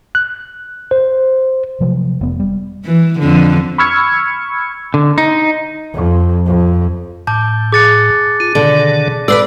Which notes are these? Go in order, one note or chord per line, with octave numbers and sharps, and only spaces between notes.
F#6
C5
C3 F3 F#3
F1 B3
G3
E3
F2 D3
B5 C#6 E6 F6 G#6 C#7
D3
D#4
F2
F2
A2 A5 D6 G6
G#4 D6 F#6 A6 C#7
F4 D#7
B2 D3 D#3 D5
A4 B4 C5 D5 E6